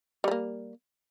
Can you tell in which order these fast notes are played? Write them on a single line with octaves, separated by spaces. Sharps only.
G3 F3 A#3